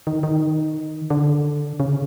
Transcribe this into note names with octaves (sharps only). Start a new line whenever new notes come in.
D#3
D#3
D3
C#3